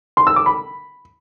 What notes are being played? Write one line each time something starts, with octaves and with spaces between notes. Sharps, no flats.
C6
E6
D6
B5